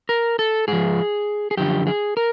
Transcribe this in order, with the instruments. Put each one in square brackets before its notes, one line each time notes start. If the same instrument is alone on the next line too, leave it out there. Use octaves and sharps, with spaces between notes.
[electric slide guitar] A#4
A4
G#2 F3 G#4
G#4
F#2 D3 F3 G4
G#4
A#4